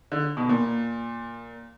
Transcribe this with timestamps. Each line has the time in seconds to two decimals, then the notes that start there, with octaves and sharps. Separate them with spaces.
0.12 D3
0.37 B2
0.49 A#2